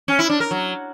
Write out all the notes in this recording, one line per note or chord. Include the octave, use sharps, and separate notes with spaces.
C#4
E4
D4
A#4
F#3